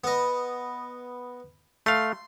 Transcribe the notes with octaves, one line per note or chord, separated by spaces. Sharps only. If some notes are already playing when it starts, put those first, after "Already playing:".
B3 D#5
A3 F5 C6